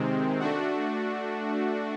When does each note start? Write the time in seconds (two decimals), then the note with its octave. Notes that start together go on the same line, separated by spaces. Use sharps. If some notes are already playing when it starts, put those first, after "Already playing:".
Already playing: C3 D#3 G#3 C4
0.40 A3 D4 F#4